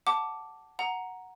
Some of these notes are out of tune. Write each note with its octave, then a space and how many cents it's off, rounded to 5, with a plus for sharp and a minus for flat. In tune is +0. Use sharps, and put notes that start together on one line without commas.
F#5 +10 A5 +5 D6 +0
F#5 +0 A#5 +0